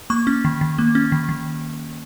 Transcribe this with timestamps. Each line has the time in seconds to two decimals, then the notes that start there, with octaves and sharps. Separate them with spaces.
0.10 A#3 C#6
0.27 C#4
0.45 D#3
0.61 D#3
0.79 A#3
0.95 C#4
1.12 D#3
1.29 D#3